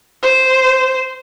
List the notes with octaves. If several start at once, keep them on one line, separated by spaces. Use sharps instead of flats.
C5